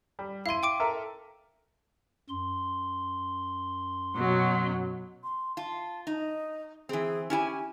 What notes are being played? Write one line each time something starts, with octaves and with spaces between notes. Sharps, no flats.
G3
E4 F5 C6 D#7
G5 D6 D7
A4 A#4 E5
F#2 C6
B2 F#3
C6
F4 A5
D#4 D#5
E3 C4 G#4
C#4 E4 G4 G#5